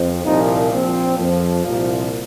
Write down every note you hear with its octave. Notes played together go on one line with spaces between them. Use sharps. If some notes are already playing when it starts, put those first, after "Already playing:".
Already playing: F2
C2 A#2 F3 D#4
A#1 A#2 F3 C4
F2 F3
C2 A#2 F3